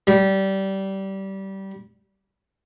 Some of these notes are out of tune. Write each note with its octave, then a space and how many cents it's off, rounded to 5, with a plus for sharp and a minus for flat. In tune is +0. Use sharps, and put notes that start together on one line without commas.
G3 -20